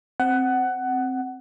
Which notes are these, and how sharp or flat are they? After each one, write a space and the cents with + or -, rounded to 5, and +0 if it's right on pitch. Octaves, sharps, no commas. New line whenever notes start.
C4 +0 F#5 +15